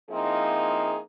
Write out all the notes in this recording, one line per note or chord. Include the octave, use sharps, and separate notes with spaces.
F3 A#3 C4 D#4 E4 G#4